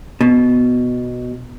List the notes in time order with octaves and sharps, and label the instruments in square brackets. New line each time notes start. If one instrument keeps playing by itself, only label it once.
[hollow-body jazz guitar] B2